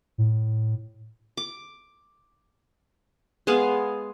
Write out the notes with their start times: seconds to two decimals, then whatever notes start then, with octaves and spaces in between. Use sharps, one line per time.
0.18 A2
1.37 D6
3.47 G#3 B3 G#4 F5